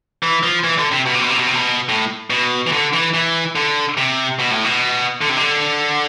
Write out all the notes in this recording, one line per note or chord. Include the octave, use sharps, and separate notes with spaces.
E3
F3
E3
D3
C3
B2
C3
B2
C3
B2
C3
B2
A2
B2
E3
D3
E3
E3
D3
C3
B2
A2
B2
D3
C3
D3